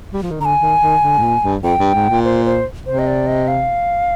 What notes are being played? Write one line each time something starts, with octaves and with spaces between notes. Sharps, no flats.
G3
F3
D#3
D3 G#5 A#5
D#3
D#3
D3
G#2
A#2
G2
F2 G5
G2
G#2
A#2
C5
C5
C3 C5
D#5
D5
D#5
F5